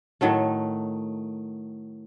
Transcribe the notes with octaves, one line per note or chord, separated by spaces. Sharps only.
A2 D#3 F#3 A3